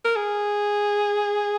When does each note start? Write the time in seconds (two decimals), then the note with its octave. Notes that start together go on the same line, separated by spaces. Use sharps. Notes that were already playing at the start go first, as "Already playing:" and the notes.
0.05 A#4
0.16 G#4